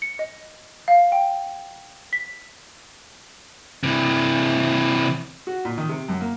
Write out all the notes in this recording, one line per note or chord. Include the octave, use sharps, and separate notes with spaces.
C#7
D#5
F5
G5
B6
C3 E3
F#4
A#2
D#3
C3
F#2
A#3